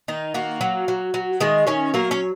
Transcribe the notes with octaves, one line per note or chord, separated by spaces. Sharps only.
D#3 D#4
A#3 F#4
F#3
F#3
F#3
D#3 G#3 G#4
D#3 C#4 C#5
F#3 A#3 A#4
C#4 C#5